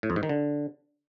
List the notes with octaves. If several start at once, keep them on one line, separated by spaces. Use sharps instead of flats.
A2
F2
G#2
D#3
D3